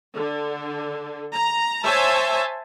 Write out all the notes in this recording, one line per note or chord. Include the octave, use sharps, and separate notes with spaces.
D3
A#5
C5 C#5 E5 G#5 A5